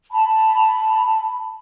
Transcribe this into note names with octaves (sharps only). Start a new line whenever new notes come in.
A5 B5